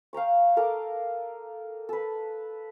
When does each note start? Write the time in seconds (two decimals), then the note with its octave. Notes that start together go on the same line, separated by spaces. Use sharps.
0.13 F5 G5 A#5 C#6
0.57 A4 A#4 D#5 D6
1.89 A4 B4